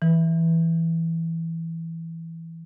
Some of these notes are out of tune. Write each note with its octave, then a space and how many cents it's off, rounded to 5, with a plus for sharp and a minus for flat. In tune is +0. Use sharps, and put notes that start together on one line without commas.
E3 +0